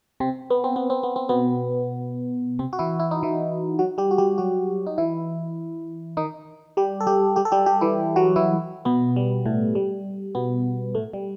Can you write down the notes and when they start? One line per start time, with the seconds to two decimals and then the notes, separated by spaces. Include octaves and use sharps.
0.20 C3 C4
0.50 B3
0.64 C4
0.76 B3
0.90 C4
1.03 B3
1.16 C4
1.29 B2 B3
2.59 C3 C4
2.73 F#4
2.79 E3 E4
3.00 E4
3.11 D#4
3.23 E3 E4
3.79 F#3 F#4
3.98 G3 G4
4.11 F#4
4.18 G3 G4
4.38 F#3 F#4
4.87 D#4
4.98 E3 E4
6.17 D#3 D#4
6.77 G3 G4
7.00 A4
7.07 G3 G4
7.36 G3 G4
7.45 A4
7.52 G3 G4
7.66 G3 G4
7.81 E3 E4
8.16 F#3 F#4
8.36 E3 E4
8.85 B2 B3
9.16 G3
9.46 A2 A3
9.75 G3
10.35 B2 B3
10.95 A2 A3
11.13 G3